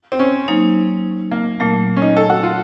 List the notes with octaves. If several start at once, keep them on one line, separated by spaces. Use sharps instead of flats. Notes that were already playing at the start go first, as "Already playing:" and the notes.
C4
C#4
F#3 A#3 D#4
A#3
A#2 F#3 A3 A#3
C#4
D#4
A4
F#4
F4